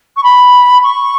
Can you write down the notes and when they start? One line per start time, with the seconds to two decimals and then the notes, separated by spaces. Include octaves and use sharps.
0.16 C#6
0.23 B5
0.83 C#6